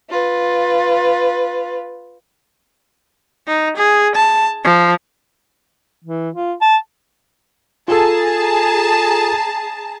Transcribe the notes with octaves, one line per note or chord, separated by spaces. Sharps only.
F4 B4
D#4
G#4
A5
F3
E3
F4
A5
F4 G#4 A4 A5 A#5